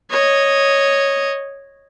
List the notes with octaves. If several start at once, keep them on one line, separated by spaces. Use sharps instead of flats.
C#5 D#5